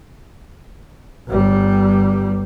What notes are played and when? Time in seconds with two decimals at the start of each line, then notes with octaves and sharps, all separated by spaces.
1.29 G1 G3